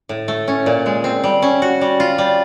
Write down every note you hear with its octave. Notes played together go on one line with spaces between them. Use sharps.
A2
A3
C#4
A#2
G#3
C4
G3
C#4
F#4
G3
F4
G3